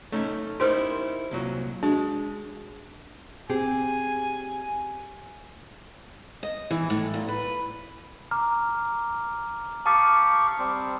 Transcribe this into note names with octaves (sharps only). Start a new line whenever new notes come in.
A3 C#4 D#4
D#4 E4 G4 A#4 C5 C6
C2 A#2 F#3
G#3 D4 F#4
C4 G4 G#4 G#5
D#5
E3
A2
A#2
B4
A#5 D6 F6
G4 F5 A5 C#6 D#6 A6
G3 C4